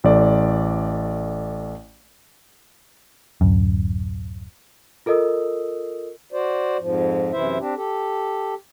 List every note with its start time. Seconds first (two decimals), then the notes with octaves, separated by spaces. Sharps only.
0.04 A1 A3 D5
3.41 D1 F#2
5.06 F4 A4 A#4 D#5 D#6 E6
6.33 F#4 C5 D5
6.79 F2 G#2 F3
7.32 F#2 C3 E3 E4 C5 E5
7.59 C4 D4 G4
7.76 G4 A4